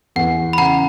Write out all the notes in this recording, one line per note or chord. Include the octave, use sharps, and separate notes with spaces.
E2 F#5
B5
C#3 F#5 A#5